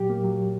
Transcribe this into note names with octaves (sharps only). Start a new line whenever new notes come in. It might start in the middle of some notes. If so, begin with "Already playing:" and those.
Already playing: A#2 F#3 G4
A#3
F#3